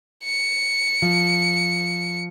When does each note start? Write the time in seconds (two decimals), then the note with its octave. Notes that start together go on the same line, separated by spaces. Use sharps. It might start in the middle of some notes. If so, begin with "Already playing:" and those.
0.24 C#7
1.02 F3